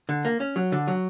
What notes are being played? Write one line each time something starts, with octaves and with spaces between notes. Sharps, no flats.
D3
A#3
C#4
F#3
D3
F#3